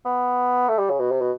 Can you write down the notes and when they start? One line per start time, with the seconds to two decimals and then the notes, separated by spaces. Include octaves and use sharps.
0.05 B3
0.69 A3
0.78 G3
0.90 C#3
1.00 B2
1.11 C3
1.21 B2